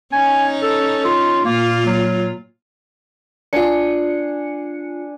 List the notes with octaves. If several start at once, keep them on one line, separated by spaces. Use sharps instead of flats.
C#4 D#4 G#5
A4
F4
A#2 A#3 F4
F#3
D4 F4 G#5 C#7